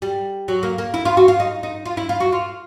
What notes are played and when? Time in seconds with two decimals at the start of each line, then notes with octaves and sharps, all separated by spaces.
0.02 G3
0.48 F#3
0.63 A#3
0.78 A#3
0.94 E4
1.05 F4
1.17 F#4
1.28 F4
1.40 D#4
1.63 D#4
1.86 F4
1.97 E4
2.09 F4
2.20 F#4
2.32 F4